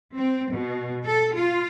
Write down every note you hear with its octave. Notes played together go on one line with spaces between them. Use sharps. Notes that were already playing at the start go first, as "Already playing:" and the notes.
C4
B2
A4
F4